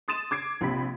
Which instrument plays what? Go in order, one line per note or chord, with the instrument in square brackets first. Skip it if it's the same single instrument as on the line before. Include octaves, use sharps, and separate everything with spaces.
[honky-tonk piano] C6 D#6 A6 D#7 E7
D6 G#6 C7 D7
A#1 C3 G4 B5 B6